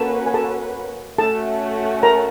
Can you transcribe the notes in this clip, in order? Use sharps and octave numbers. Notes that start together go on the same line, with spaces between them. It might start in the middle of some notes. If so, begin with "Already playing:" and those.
Already playing: A#3 C#4 F#4 A4 B4 A5
G#5
A4 A5
A3 C#4 F#4 A4 A5
A#4 A#5